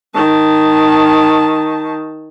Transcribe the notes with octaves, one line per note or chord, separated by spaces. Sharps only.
D#3 A5